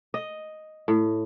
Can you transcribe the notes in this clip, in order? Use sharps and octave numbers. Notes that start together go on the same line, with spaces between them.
D#5
A2